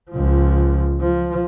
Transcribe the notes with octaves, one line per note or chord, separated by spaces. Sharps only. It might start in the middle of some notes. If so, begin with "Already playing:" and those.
C#2 F3
F3